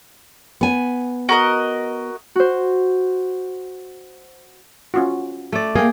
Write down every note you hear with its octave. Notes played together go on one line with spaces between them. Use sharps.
B3 G#5
F#4 A#4 D#5
F#4 C5
C#4 F4 F#4
A3 D5
A#3 G#4 G5